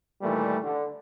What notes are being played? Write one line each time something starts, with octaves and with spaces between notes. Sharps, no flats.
A#2 D#3 E3 G3 A3
D3